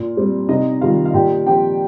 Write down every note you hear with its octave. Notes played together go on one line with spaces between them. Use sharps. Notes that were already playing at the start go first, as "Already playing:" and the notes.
Already playing: A#2
G3 C4
C3 D#4 D#5
D#3 G3 F4 F5
F5
A#2 G4 G5
F3 C4 G4 G5